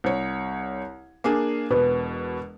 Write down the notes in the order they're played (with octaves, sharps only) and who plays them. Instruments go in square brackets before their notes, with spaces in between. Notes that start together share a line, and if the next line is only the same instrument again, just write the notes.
[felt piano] C2 C#5
A#3 D4 G#4
[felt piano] E1 B2 [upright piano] B4